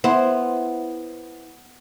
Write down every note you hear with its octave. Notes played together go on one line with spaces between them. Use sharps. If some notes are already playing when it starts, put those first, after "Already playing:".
B3 E4 C5